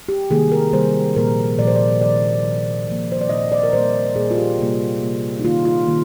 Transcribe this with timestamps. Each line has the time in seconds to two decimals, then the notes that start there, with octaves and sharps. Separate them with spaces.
0.09 G4
0.30 C3 D#3 G3 A#3 G#4
0.52 A#4
0.73 C3 D#3 G3 A#3 C5
1.16 A#2 F3 A#3 A#4
1.59 A#2 F3 A#3 D5
1.67 C5
1.76 D5
2.01 D#3 A#3 D5
2.44 D#3 A#3
2.87 A#2 F3 A#3
3.12 C5
3.21 D5
3.29 A#2 F3 A#3 D#5
3.52 D5
3.63 A#4
3.73 A#2 G3 A#3 C5
4.16 A#2 G3 A#3 G#4
4.31 F4
4.38 G4
4.59 C3 G3 A#3
5.01 C3 G3 A#3
5.40 D#4
5.44 D#3 A#3 F4
5.65 F4
5.87 D#3 A#3